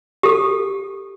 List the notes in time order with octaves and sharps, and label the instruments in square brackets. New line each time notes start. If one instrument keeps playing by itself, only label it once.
[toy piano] G4 A4